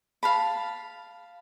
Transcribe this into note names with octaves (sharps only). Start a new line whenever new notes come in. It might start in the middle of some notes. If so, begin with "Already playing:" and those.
F5 A5 B5